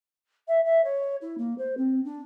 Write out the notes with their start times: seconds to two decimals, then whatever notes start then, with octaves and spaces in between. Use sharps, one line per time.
0.48 E5
0.65 E5
0.84 C#5
1.21 E4
1.37 A#3
1.58 C5
1.77 C4
2.04 D4